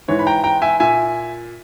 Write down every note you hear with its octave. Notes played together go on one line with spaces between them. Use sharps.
G#2 E3 C#5
B5
G5 A#5
G5 A#5
E5 G#5
A#2 E5 G#5